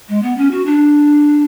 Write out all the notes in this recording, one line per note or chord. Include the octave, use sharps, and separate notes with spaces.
G#3
B3
C#4
F#4
D4